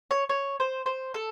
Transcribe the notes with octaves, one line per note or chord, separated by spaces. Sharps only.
C#5
C#5
C5
C5
A4